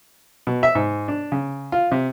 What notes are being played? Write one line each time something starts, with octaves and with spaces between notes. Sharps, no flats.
B2
E5
G#2
D4
C#3
F4
C3